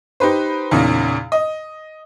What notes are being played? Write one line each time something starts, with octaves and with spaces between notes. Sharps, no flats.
D#4 G4 B4 C5
E2 A#2 C#3 D#4
D#5